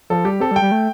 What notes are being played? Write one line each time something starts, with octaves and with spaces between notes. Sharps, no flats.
F3 A4
G3 G4
C4 A4
G3
G5
G3
A3